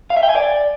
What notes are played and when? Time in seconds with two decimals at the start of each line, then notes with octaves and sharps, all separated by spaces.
0.10 F5
0.17 E5
0.23 G5
0.29 G#5
0.35 D5